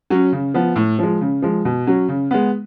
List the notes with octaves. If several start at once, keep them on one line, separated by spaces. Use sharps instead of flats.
F#3 C#4
C#3
F3 B3
A2
F3 G#3
C#3
F3 G#3
B2
F#3 C#4
C#3
G#3 B3